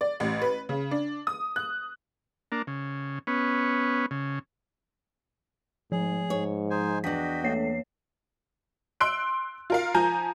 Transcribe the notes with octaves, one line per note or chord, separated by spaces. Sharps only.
D5
A1
B4
C#3
D4
D#6
F#6
A#3 D4
C#3
B3 C#4
C#3
G#2 F3 G#4
G#2 C#5
D#4 C5 G#5
E2 D4 F#4 D#5 G5 B6
A3 A#3 C#5 C7
C6 E6 F#6 D7
F4 A#4 F5
F3 G#5 A#5 G6